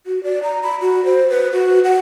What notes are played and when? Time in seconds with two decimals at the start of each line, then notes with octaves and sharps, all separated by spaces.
0.06 F#4
0.24 D5
0.43 A#5
0.63 B5
0.82 F#4
1.05 C5
1.30 B4
1.53 F#4
1.84 F#5